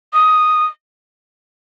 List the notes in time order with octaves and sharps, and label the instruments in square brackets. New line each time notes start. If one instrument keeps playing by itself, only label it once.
[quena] D#6